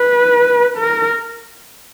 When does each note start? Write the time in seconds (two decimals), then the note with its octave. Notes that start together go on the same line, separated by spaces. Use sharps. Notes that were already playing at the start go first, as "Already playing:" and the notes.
Already playing: B4
0.77 A#4